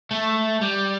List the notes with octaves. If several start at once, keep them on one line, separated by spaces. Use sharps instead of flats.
A3
G3